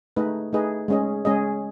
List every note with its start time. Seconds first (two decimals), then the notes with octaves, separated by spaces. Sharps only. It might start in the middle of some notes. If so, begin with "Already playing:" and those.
0.16 A3 D#4 G#4 B4 D#5
0.53 A3 D#4 G#4 B4 D#5
0.88 G#3 C#4 G#4 D#5
1.25 G#3 C#4 G#4 D#5